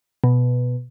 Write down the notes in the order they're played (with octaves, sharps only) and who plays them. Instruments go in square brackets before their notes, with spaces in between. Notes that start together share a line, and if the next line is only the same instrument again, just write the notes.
[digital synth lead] B2